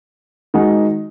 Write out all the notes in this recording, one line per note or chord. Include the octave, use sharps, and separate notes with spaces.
D#3 G#3 D#4 F#4